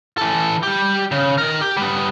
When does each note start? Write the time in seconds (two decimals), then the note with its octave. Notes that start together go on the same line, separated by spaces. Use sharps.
0.18 E3 A4
0.63 G3 G4
1.11 C#3
1.38 D#3 A#4
1.61 G4
1.77 G3 B3